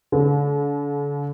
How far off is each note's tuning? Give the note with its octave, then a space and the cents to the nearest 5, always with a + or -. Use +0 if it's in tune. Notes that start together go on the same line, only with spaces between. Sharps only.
D3 -40